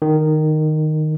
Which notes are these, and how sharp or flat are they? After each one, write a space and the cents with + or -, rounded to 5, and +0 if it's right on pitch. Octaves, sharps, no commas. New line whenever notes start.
D#3 -10